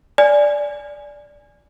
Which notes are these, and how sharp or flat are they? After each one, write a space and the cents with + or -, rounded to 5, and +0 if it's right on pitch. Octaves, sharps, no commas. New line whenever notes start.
D5 -5 G#5 +0